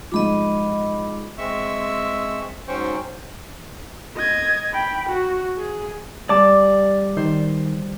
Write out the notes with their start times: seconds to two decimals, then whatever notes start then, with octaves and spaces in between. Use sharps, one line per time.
0.12 G#2 F3 D#5 B5 D6
1.38 G#3 C4 E5 C#6 E6
2.68 G#2 F#3 C#4 C5 G5 C#6
4.16 D#5 G#6
4.73 G5 B5
5.09 F#4
5.58 G#4
6.29 G3 D5 A5 D6
7.17 D#3 C5